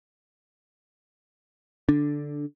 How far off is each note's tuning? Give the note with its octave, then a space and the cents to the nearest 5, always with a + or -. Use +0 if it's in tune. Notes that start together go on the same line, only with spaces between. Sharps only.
D3 -5 D4 +0